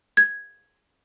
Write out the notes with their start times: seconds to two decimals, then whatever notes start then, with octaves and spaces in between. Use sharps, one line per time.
0.17 G#6